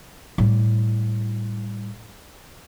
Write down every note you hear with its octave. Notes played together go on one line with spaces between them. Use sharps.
A2 G3